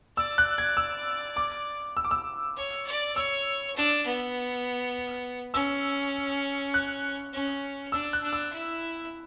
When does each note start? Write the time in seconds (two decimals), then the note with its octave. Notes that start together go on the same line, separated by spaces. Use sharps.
0.17 D5 E6
0.38 F#6
0.58 G#6
0.77 E6
1.36 D6
1.97 E6
2.04 D6
2.11 E6
2.56 C#5
2.86 D5
3.16 C#5 E6
3.76 D4
4.06 B3
5.54 C#4 E6
6.74 F#6
7.33 C#4
7.92 D4 E6
8.13 F#6
8.23 D4
8.33 E6
8.53 E4